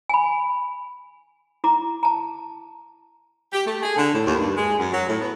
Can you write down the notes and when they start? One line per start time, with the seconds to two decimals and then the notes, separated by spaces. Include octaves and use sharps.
0.09 G#5 B5
1.64 E4 A#5 D6
2.03 A5 A#5
3.52 G4
3.66 A3
3.83 G#4
3.96 D3
4.13 A2
4.25 D#2
4.38 G2
4.56 G#3
4.78 F#2
4.92 F#3
5.07 A2
5.20 B3